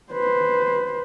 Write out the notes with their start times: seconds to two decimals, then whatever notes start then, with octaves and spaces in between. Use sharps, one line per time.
0.13 B4 C5